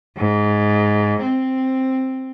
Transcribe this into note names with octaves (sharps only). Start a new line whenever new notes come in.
G#2
C4